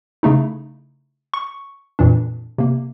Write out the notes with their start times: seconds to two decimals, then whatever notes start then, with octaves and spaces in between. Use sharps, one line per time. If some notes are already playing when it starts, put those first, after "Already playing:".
0.23 C#3 A3 D#4 E4
1.34 C#6
1.99 F2 A#2 E3 D4
2.58 C3 A#3